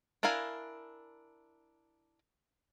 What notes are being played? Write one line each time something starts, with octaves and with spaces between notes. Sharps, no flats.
D4 E4 A#4 F5 G#5